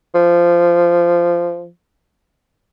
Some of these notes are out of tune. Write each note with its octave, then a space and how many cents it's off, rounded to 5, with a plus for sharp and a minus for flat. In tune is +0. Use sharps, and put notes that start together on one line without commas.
F3 -15